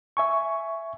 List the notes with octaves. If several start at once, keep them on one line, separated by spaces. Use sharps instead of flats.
E5 G#5 C#6